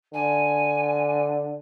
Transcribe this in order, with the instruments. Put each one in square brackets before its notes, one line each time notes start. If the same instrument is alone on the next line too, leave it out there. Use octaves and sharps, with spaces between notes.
[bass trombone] D3 [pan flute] G#5